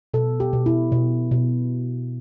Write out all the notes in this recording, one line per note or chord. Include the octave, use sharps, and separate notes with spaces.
B2 A4
G4
B2
E4
B2
B2